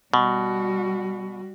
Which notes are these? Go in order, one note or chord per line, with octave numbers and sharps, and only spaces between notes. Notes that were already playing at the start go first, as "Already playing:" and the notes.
B2 G3 F#4